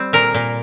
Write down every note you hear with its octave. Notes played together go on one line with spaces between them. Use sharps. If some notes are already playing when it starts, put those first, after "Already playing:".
Already playing: G3 C4
A#2 A#4
A#2